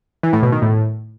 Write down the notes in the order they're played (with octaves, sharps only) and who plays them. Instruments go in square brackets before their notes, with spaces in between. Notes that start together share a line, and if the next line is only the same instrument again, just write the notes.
[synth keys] E3
A2
B2
D#3
A2